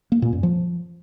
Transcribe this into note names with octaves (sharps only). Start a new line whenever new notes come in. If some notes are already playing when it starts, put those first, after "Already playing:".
A#3
A#2
F#2
F3